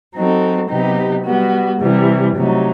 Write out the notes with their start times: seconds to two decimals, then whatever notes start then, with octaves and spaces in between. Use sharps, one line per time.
0.15 F#3 C4 D#4 F#4 A4
0.69 C3 F#3 B3 D#4 G4
1.24 G3 B3 F#4
1.79 C3 E3 G3
2.35 C3 F#3 A3 D#4